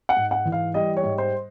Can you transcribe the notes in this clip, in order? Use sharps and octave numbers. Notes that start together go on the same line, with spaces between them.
F#5
G#2
F#5
E3
F5
G3 D#5
C#5
G#2
C5